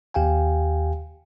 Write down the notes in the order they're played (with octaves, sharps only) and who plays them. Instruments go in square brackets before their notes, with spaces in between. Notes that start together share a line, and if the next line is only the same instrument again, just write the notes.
[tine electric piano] D#2 G4 F5 G5 G#5